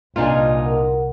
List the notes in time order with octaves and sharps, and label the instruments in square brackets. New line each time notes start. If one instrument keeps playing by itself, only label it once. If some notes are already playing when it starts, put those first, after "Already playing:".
[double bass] C2 [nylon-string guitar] A#2 D4 G#5 [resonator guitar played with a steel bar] D#4 F4
[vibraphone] A#4 F#5